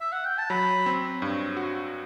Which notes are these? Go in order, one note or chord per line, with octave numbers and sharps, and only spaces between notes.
E5
F#5
G5
A5
F#3 B5
C4
G2
F#4